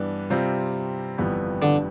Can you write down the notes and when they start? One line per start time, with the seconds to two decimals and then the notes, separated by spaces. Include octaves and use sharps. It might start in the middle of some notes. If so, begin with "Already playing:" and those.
Already playing: G2 E3 B3 D4
0.30 C3 G3 C4 F4
1.18 G1 F2 E3 G3 B3
1.62 D3